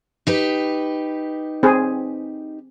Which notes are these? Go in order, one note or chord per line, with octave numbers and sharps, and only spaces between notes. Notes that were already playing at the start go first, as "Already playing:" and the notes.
D#4 G4 B4
C4 G#4